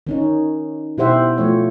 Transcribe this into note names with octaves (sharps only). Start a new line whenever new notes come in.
D#3 C#4 D#4
B2 E4 G4 C5 E5 F#5
F3 A3 C#5